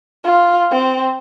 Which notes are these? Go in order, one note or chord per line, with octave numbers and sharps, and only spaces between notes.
F4
C4